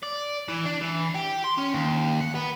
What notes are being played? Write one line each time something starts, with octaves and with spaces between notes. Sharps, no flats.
D5
E3
D4
E3
G4
C6
C#4
D#2
F#5
B3